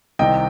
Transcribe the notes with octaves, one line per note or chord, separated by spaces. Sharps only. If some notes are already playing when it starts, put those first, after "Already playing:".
C2 C3 D#3 D#5 G5